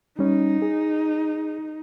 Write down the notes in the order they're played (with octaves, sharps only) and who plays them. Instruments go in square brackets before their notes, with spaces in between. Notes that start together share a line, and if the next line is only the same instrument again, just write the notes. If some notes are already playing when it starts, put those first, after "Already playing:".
[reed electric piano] G3 C#4 [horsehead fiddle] D#4
[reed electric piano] G#4